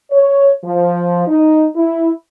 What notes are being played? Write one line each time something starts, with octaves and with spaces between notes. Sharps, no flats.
C#5
F3
D#4
E4